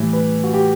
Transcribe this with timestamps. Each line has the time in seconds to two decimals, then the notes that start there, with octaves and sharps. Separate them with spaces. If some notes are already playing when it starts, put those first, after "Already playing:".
Already playing: A2 E3 G3
0.13 B4
0.44 F#4
0.54 G4